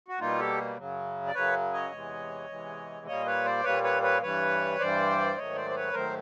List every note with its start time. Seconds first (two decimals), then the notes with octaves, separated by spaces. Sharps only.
0.08 F#4
0.20 B2 G3 A#3 D#4 F4
0.39 G4 A4
0.77 F#2 C#3 F#3
1.27 D5
1.34 F#2 C#3 F#3 B4 C#5
1.73 C#5 D#5
1.92 E2 C3 E3 G#3
2.49 E2 C3 E3 G#3
3.07 A#2 G3 A#3 C#5 D#5
3.26 B4 C#5
3.45 C5 D5
3.64 A#2 G3 A#3 B4 C#5
3.83 B4 C#5
4.02 B4 C#5
4.22 G2 E3 G3 B4 C#5
4.79 G2 E3 G3 C5 D5
5.36 G#2 D#3 F#3 A3 C#5 D#5
5.56 C5 D5
5.70 C5
5.75 B4 C#5
5.93 G#2 D#3 F#3 A3 A#4 C5